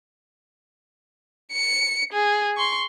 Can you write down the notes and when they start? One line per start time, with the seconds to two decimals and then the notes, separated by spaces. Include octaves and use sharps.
1.52 C#7
2.13 G#4
2.57 C6 C#6